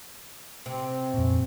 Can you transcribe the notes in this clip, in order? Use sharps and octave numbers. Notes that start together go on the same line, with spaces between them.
C3
F2 A#2